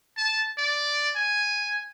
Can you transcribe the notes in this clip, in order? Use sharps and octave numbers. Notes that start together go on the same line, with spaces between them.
A5
D5
G#5